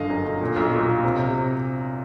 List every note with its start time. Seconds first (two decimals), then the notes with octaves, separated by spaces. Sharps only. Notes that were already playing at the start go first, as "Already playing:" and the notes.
Already playing: G1 D3 D#5 F5
0.10 F#2
0.26 D3
0.41 A#2
0.56 B1
0.73 A#2
0.88 A#2
1.04 C3
1.19 C3